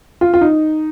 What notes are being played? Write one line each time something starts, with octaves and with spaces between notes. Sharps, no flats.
F4
F4
D#4